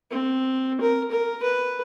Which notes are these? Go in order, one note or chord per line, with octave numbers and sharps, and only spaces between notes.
C4
A#4
A#4
B4